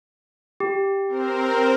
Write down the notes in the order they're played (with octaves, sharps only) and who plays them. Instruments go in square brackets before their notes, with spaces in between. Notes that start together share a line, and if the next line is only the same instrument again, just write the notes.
[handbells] G4
[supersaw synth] C4 A#4 C5